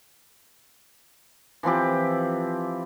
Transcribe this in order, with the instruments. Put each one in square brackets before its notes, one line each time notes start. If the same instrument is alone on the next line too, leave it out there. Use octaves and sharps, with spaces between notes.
[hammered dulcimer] E3 F3 C4 G4